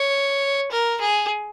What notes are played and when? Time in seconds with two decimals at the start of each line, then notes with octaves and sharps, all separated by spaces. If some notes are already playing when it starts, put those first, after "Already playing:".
Already playing: C#5
0.72 A#4
1.01 G#4